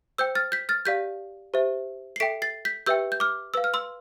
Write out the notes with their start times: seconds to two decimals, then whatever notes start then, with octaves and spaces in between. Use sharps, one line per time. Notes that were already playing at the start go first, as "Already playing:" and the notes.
0.18 C5 G5 E6 G6
0.35 F6 A6
0.52 G6 B6
0.69 F6 A6
0.85 G4 D5 F5 G6 B6
1.54 G4 C5 E5
2.16 C7
2.20 A4 E5 G5 B6 D7
2.42 A6 C7
2.65 G6 B6
2.86 G4 B4 E5 G5 E6 G6
3.12 G6
3.20 D6 F6
3.54 B4 F5 E6
3.64 F6
3.74 C6 E6